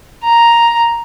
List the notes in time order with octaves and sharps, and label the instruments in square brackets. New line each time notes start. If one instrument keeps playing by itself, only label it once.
[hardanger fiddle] A#5